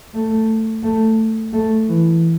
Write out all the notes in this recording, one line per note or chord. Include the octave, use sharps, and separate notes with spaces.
A3
A3
A3
E3